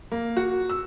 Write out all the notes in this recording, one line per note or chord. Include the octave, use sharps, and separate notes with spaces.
A#3
F#4
E6